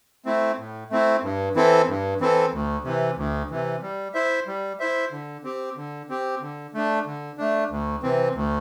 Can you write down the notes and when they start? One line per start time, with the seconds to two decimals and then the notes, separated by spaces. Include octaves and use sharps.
0.26 A3 C4 E4
0.58 A2
0.90 A3 C4 E4
1.23 G2
1.55 E3 C4 E4 A4
1.88 G2
2.20 E3 C4 E4 A4
2.53 D2
2.84 C3 E3
3.17 D2
3.50 C3 E3
3.82 G3
4.14 E4 C5 E5
4.47 G3
4.80 E4 C5 E5
5.12 D3
5.44 C4 G4
5.77 D3
6.09 C4 G4
6.41 D3
6.74 A3 D4
7.06 D3
7.38 A3 D4
7.70 D2
8.03 C3 E3 C4
8.35 D2